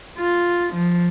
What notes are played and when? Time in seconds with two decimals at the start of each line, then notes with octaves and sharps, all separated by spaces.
0.18 F4
0.74 F3